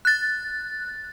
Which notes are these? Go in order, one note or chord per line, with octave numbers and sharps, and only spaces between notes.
F#6 A6